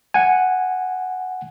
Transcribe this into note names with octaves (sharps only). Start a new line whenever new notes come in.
F#5 G#5